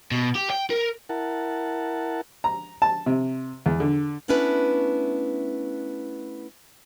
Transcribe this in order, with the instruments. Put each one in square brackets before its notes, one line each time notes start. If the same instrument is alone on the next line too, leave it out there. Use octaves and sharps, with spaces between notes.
[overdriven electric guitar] B2
G4
G5
A#4
[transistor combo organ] E4 A#4 F#5 A5
[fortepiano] A#5
A5
C3
E2
D3
[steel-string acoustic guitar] A3 B3 C#4 D4 E4 B4